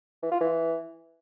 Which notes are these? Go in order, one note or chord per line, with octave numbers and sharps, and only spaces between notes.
E3
F4
E3